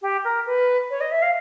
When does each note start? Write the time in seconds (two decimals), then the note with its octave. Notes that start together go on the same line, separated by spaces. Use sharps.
0.02 G4
0.24 A#4
0.46 B4
0.90 C#5
1.00 D#5
1.11 E5
1.22 F5